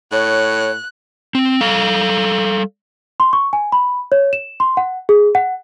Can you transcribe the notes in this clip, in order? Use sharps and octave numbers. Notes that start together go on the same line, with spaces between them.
A2 C#5 F#6
C4
G3 A4 F5
C6
C#6
G#5
B5
C#5
E7
C6
F#5
G#4
F#5